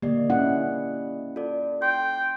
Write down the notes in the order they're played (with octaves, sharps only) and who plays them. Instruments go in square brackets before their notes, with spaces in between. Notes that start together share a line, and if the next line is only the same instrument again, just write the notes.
[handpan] D3 A#3 [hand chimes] G4 D5 D#5
[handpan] C#4 E4 F#5
[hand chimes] F4 A4 D5
[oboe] G5 [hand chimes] C6